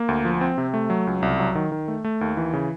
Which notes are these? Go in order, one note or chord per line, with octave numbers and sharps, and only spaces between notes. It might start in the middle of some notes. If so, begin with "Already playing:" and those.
Already playing: A#3
D2
F3
C4
C3
A3
F#3
C#2
C2
F#3
D#3
D#3
A3
A3
D#2
E3
C#3